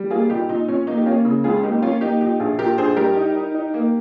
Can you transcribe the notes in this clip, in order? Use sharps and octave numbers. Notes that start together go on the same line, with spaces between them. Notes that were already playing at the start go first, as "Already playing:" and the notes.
Already playing: G3
A#3 F4 G#4
A#2 D#4 G4
A#2 D#4
A#2 C#4
A#3 D#4
G4
A#3 C#4 F4
C#3
C#2 F4 G#4
A#3 D#4 G4
A#3 C#4 F4
A#3 D#4 G4
A#2 D#4 G4
A#1 F4 G#4
A#2 G4 A#4
A#1 G#4 C5
G3 G4 A#4
D#4
D#4
D#4
A#3